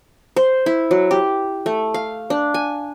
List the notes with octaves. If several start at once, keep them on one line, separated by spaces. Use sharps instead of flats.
C5
E4
F#3
G4
A3
F5
D4
G#5